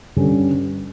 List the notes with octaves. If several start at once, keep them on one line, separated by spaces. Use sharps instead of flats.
G2 D3 G3 C#4